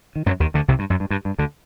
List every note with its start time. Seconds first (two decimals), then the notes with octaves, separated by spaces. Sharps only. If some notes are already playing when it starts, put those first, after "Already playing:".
0.16 D#3
0.26 F#2 F#3
0.40 D#2 D#3
0.54 D2 D3
0.68 C2 C3
0.79 G2
0.90 F#2
1.00 G2
1.10 G2
1.25 G2
1.39 D2 D3